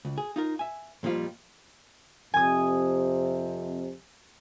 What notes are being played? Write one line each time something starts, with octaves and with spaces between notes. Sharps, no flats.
C#2
G#4
D#4 F4 A#4
E5 G#5
F2 A#2 F3 G3 F4
F2 C3 G#5 D#6